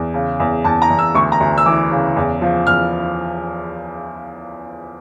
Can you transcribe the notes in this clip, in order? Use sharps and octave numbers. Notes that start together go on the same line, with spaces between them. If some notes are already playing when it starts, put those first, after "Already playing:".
Already playing: E2
C#3
E2
E2 A5
A#5
E2
E6
D2 C#6
A#5
D2
E6
E3 D6
C#3
E2
F3
E2 F6